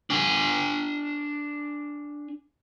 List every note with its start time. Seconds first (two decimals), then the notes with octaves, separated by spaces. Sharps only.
0.10 D4 G#5